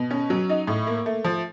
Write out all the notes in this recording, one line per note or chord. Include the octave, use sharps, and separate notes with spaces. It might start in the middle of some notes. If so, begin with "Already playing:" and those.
Already playing: B2
C#4
F#3
D#4
A2
A#3
A3
F3